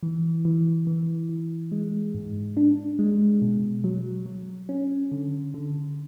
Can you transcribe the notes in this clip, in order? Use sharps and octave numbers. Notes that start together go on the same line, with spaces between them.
E3
E3
E3
E3
G#3
G#2
D4
G#3
B2
F#3
F#3
C#4
D3
D3